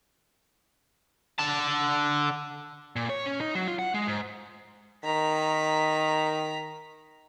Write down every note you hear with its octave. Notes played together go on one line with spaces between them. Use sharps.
D3 A5
A#2
C#5
C#4
D#4
F#3
F4
F#5
G#3
G#2
D#3 A#5 B6